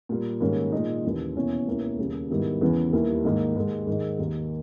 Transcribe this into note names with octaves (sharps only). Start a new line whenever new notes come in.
A#2 G3 A#3
G#2 D#3 G3 A#3 C#4
A#2 G#3 D#4
D#2 C#3 E3
E2 B2 A#3 C#4 E4
C#2 B2 A#3 C#4 E4
D#2 C#3 G3 A#3
G#2 D#3 G3 B3 E4
E2 C#3 E3
D#2 D#3 G3 A#3 E4
G#2 D#3 A#3 D#4
G#2 D#3 G#3
G#2 D#3 G#3 D#4
D#2 D#3 A#3